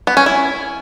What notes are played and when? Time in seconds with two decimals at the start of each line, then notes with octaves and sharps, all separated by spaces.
0.07 B3
0.17 C#4
0.26 E4